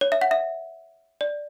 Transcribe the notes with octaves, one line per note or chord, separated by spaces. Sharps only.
C#5
E5
F#5
E5
D5